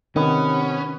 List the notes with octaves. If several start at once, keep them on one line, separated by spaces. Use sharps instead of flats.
C3 D#3 B3 C#4 F#5